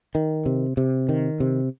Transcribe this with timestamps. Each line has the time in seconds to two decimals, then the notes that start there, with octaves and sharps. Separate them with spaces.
0.15 D#3
0.46 C3
0.77 C3
1.09 D#3
1.40 C3